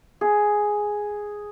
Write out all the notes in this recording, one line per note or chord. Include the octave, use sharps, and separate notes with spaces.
G#4